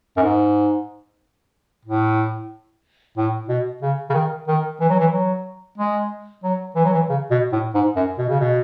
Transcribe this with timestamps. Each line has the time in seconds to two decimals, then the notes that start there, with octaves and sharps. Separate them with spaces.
0.17 F#2
0.22 G#2
1.85 A2
3.17 A2
3.48 B2
3.82 C#3
4.09 C#3
4.14 D#3
4.48 D#3
4.80 E3
4.89 F#3
5.00 E3
5.12 F#3
5.78 G#3
6.43 F#3
6.75 E3
6.85 F#3
6.93 E3
7.09 C#3
7.30 B2
7.52 A2
7.74 G#2
7.96 F#2
8.18 B2
8.29 C#3
8.40 B2